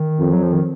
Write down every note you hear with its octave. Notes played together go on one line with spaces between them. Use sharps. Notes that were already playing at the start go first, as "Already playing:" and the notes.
Already playing: D#3
F2
F#3
F3
D#3